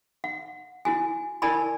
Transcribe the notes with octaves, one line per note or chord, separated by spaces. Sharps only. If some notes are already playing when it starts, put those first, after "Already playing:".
F#5
E4 F#4 G#5
E4 A#4 D5 G#5 A5 B5